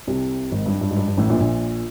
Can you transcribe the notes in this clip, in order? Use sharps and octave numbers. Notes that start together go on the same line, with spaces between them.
C2 C3
G#1 G#2
G2
G2
G#2
G2
G2
A1 A2
A#1 A#2
A#1 A#2